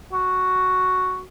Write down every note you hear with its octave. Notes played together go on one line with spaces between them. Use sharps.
F#4